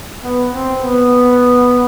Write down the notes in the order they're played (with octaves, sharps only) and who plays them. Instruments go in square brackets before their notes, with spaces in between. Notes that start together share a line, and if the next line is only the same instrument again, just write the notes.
[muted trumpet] B3
C4
B3